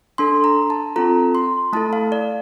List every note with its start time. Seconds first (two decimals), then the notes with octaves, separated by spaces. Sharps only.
0.18 D4 A4 C6
0.44 A#5
0.70 A5
0.96 C4 F4 A4 A#5
1.35 C6
1.73 A3 E4 A4 A5
1.93 F5
2.12 D5